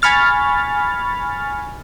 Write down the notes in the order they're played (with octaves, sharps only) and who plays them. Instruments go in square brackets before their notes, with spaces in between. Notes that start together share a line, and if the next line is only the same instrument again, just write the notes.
[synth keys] G#5 B5 C#6 F6 A6